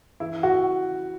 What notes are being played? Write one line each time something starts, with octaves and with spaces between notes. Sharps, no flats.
E3 E4
F#4